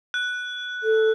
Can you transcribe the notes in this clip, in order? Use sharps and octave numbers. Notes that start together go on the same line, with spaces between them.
F#6
A4